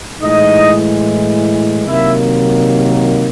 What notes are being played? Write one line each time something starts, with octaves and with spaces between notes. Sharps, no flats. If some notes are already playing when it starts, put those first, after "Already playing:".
A2 E3 G#3 D#4 D#5
C3 D#3 F#3 A#3 E4 E5